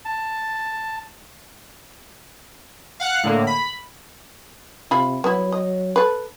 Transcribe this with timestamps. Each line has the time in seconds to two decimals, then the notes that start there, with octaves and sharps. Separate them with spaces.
0.05 A5
3.00 F5 F#5 F#6 C#7
3.24 A2 D3 A#3
3.47 B5
4.91 C3 F4 F5 B5
5.24 F#3 B3 E4
5.52 D#5
5.96 A4 B4